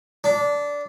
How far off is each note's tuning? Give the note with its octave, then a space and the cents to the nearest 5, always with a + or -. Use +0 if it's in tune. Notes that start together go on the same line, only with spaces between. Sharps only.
D4 -15